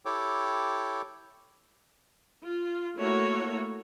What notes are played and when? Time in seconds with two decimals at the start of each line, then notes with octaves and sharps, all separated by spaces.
0.05 E4 G4 A4 C#5 G5 D6
2.43 F4
2.96 A3 A#3 E4 F#4 A4 C#5